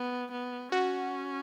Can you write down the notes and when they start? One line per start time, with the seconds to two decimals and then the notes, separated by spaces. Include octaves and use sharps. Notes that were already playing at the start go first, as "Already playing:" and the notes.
Already playing: B3
0.32 B3
0.72 C#4 F#4